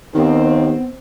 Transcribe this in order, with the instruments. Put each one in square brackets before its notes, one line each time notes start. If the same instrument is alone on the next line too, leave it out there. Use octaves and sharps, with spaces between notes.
[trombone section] D#2 [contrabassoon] D#3 [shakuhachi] B3 [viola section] C4